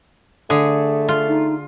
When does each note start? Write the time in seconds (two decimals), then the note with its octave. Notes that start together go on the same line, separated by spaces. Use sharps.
0.50 D3 A3 G#4
1.09 F4
1.28 D#4